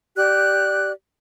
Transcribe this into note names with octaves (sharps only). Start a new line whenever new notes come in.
G4 D5 F#6